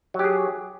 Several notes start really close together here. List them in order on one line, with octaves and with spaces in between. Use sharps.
F#3 G4 G#4